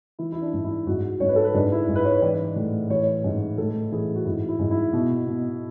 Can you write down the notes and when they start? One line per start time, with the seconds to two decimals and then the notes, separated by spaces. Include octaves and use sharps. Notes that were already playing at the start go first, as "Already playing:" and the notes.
0.19 E3 E4
0.32 E4
0.42 D4
0.53 G#2
0.65 E4
0.87 G#2 F#4
1.20 G#2 C#5
1.29 B4
1.36 A4
1.44 B4
1.54 G#2 D4
1.72 E4
1.89 G#2
1.95 B4
2.05 C#5
2.22 E3 D5
2.56 A2
2.90 E3 C#5
3.24 G#2
3.58 A2 A4
3.92 E3 G#4
4.15 F#4
4.25 G#2 E4
4.49 E4
4.59 G#2
4.71 E4
4.93 B2
5.27 B2